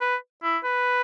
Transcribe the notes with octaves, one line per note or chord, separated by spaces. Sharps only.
B4
E4
B4